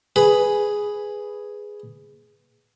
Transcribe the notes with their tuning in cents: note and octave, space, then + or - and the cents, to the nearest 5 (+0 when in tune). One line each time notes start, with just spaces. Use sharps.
G#4 +0 B4 +5 B5 +0